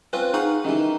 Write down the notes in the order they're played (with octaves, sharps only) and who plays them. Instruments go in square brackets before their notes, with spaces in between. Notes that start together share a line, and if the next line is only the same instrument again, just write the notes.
[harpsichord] C4 C#4 F4 [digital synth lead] B4
[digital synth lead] D#4 [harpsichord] G#4 F5 F#5 [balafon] C#6
[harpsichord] D#3 E3 [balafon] C#4 G4 D#5